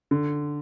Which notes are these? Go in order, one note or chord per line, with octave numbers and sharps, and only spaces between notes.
D3